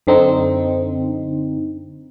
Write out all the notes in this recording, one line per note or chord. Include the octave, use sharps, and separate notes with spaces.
F#2 D3 C4 D#4